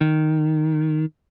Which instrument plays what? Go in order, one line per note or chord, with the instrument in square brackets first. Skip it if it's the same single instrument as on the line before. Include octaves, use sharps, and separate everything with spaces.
[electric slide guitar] D#3